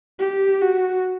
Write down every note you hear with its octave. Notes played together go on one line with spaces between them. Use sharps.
G4
F#4